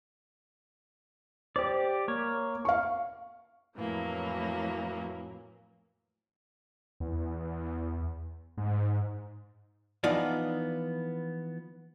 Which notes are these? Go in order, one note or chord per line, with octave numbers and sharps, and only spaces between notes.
G4 C5 D5
A#3 C#5
F5 C#6
F2 A2 E3 F#3 A#3
E2
G#2
E3 F3 B3 D#4 F4 D5